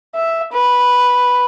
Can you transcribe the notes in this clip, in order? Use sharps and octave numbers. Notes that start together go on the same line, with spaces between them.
E5
B4